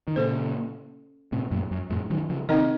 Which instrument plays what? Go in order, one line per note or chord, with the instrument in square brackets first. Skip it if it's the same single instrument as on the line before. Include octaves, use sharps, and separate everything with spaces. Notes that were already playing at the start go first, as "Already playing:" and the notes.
[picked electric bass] D#3
[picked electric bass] A#2 C#3 [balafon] C#4 A4 C5
[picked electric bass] A2 C3
F#2 A#2
F#2
F2 A2
D#3 F#3
C#3 F3
[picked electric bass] C3 D#3 [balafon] C4 D#4 A#4 D#5